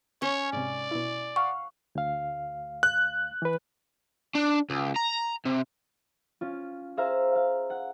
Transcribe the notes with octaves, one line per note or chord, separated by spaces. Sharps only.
C#4 C#5
G#2 C3 D5
B2 E4
F5 F#5 C#6
D2 F5
F#6
E3 B4
D4
C#2
A#5
C3
C#4 F4
G#4 C5 E5 F5 A#5
F5
F#5